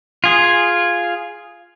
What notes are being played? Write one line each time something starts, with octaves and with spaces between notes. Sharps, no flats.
F4 G#4